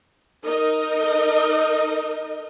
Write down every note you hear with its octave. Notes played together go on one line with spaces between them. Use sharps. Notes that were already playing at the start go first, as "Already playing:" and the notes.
D#4 A#4 D#5